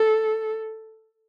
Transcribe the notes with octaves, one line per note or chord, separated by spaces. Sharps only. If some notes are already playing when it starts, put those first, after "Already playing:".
Already playing: A4